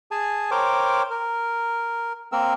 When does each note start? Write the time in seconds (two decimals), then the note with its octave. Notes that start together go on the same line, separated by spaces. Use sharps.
0.11 G#4 G#5 A5
0.51 A#4 C5 C#5 G5 D6
1.11 A#4
2.32 A#3 C4 A#4 E6